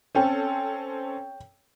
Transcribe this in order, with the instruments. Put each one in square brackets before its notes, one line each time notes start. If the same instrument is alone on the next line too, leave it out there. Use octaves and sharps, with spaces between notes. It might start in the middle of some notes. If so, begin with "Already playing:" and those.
[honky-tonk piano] C4 C#4 A4 [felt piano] C#5 G5